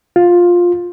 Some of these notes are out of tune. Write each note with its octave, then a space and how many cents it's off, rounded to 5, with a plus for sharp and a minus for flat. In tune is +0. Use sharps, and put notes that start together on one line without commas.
F4 +10